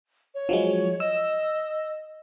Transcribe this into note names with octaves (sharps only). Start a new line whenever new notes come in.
C#5
F3 F#3 G#3
D#5 E6